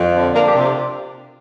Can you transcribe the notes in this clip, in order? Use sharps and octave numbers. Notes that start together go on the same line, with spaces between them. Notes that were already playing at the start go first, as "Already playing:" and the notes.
Already playing: F2
D3
A#3 D4 A#4
G4
C3
F4